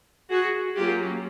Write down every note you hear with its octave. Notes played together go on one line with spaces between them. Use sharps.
F#4 G#4
F#3 A#3 C#4 F4 G4